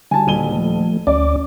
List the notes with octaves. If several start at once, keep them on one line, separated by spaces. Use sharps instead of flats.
D3 G3 G#5 A5
D#1 D#7 G7
F3 A3
D2 C#4 D5 D6